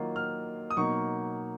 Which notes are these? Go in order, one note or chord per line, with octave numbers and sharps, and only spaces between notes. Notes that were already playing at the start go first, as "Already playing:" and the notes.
Already playing: D#3 F#3 A#3 F4
F6
D#6
B2 F#3 A#3 D#4 C#6